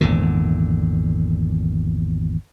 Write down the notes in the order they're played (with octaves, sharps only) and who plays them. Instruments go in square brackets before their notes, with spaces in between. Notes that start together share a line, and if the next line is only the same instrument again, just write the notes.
[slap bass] G#1 E2 A#2 D3